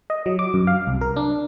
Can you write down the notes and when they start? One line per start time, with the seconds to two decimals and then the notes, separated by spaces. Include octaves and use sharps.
0.10 D#5
0.26 F#3
0.39 D6
0.54 F#2
0.67 F5
0.87 C2
1.01 A#4
1.16 D4